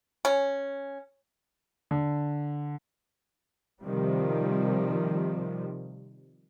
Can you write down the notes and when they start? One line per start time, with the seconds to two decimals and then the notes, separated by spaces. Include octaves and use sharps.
0.25 C#4
1.91 D3
3.82 C3 D#3 F3 G3